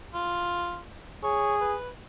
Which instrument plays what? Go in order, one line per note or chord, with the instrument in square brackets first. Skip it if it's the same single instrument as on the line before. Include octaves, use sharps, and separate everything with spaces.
[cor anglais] F4
[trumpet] G#4 [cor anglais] C#5
[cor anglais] B4